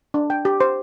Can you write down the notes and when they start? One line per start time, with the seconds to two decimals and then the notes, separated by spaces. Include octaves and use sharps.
0.14 D4
0.30 G5
0.45 G4
0.61 C5